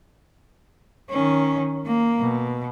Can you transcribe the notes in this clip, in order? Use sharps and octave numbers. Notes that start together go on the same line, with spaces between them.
D#3 C#4
A#3
B2